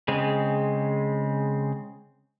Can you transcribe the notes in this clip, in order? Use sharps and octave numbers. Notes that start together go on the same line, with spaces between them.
C#3 G#3 C4